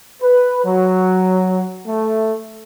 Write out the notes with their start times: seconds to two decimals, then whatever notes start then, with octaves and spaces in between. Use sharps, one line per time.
0.23 B4
0.65 F#3
1.87 A3